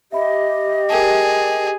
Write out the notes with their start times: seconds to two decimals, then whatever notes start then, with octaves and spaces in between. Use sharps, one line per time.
0.12 G4 D#5 E5 B5
0.90 G#4 A#4 G5 A5